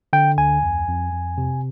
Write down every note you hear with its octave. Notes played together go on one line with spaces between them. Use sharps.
D3 G5
D2 G#5
F2
F2
F2
C3